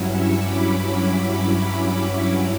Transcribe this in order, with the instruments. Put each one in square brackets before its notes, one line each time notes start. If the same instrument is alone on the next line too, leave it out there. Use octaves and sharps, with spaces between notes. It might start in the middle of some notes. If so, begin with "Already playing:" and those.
Already playing: [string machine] G2 F#3 C#4 E4
C#6 E6
B5 D6